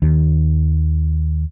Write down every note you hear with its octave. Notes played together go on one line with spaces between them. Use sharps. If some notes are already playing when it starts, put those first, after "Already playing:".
D#2 D#3